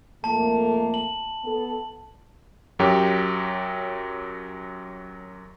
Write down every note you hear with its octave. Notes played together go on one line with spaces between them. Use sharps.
F2 A3 A#3 A5
F#7
B3 A4
F#2 F#3 G4